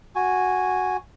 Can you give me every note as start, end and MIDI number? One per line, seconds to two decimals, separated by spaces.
0.15 0.97 66
0.15 0.97 80